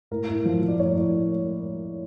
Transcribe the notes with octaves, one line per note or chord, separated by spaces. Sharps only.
A2 A#4
A2
F3
F3
D5
A2 C#5
A2